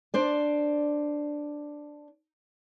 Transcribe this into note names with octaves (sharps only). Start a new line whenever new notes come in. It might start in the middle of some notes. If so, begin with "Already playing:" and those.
D4 C5 D5